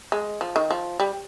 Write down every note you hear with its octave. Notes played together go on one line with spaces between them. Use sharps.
G#3
F3
D#3
F3
G3